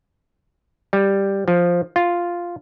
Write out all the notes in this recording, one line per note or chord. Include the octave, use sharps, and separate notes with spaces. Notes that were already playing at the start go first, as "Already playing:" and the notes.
G3
F3
F4